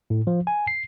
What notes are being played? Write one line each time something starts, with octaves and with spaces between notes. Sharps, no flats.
A2
F3
G#5
C7